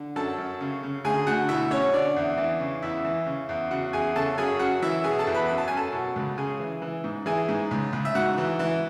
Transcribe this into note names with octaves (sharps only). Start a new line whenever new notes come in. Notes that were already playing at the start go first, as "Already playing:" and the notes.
Already playing: D3
F#2 A4 A5
F#2
C#3
C#3
D2 G#4 G#5
D2 F#4 F#5
B2 E4 E5
B2 C#4 C#5
D3 D4 D5
E2
E3
C#3
E2 E4 E5
E3
C#3
E2
C#3 F#4 F#5
E2 G#4 G#5
C#3 A4 A5
F#2 G#4 G#5
F#2 F#4 F#5
E3 E4 E5
B2 G#4 G#5
A4 A5
E2
B4 B5
F#2 B5
A5
F#2 G#5
A4 A5
B2
C#2
C#3 G#4 G#5
E3
E3
G#2
E3 G#4 G#5
G#2
C#2
C#2
E5
G#2 F#4 F#5
E3
E3